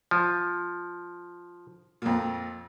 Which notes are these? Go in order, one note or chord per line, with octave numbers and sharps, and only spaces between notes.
F3
F2 A#2